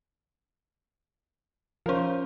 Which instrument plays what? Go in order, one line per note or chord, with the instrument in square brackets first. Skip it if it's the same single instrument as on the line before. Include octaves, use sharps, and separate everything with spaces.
[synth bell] F3 C#4 [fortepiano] A#4 C5